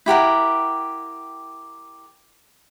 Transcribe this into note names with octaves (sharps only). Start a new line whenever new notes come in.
E4 G4 A#4 F#5